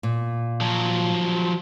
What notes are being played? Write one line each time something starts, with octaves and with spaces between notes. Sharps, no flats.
A#2
F3 F#3